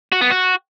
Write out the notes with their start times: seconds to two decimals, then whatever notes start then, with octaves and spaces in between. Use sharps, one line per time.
0.12 F#4
0.21 B3
0.30 F#4